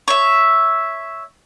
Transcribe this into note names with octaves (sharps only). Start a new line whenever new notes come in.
C#5 E5